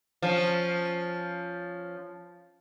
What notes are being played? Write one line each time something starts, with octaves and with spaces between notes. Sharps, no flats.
F3 C#4